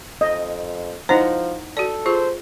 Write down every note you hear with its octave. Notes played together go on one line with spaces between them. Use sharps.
F2 D#5
F3 D#4 E4 C5 F#5 A#5
F#4 A4 D5
F4 G#4 C5